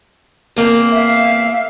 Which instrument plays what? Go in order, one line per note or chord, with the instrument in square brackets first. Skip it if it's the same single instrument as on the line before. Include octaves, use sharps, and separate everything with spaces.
[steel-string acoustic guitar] E2 A#3 C4
[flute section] E5 F5